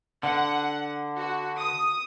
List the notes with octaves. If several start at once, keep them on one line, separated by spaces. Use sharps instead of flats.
D3 F#5
F#4
D#6